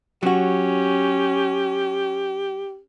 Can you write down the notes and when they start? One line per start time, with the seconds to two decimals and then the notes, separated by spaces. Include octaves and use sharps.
0.23 F#3 C#4 F#4 G4